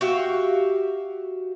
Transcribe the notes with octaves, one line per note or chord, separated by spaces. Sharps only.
F#4 G4 E5 F5